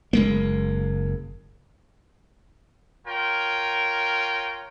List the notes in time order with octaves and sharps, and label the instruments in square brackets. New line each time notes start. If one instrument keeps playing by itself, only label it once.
[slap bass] F#1 G#3 A#3
[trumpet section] F4 A#4 C#5 G5